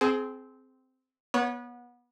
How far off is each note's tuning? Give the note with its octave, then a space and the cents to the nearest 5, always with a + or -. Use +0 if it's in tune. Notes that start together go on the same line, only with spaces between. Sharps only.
C4 -10 G#4 +25
B3 -25 C#5 +0